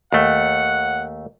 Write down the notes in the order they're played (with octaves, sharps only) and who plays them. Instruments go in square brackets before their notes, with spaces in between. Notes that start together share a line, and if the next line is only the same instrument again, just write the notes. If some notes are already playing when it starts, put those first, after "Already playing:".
[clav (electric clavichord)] D#2 A3 [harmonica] F#5